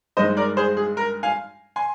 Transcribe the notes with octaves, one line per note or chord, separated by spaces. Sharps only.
G2 D#3 G#3 D#4 C5 D#5
A#4 D5
G#4 C5
G#4
A#4
F5 G#5
G#5 C6